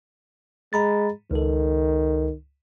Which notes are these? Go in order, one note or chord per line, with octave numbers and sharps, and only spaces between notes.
G#3 A#5 B5 A6
C#2 D#3 A4